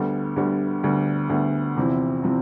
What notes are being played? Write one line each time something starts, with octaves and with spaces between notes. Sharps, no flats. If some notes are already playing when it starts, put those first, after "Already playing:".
Already playing: D2 D3 G3 B3
D2 D3 G3 B3
D2 D3 G3 B3
D2 D3 G3 B3
E2 C3 F3 C4 E4
C3 F3 C4 E4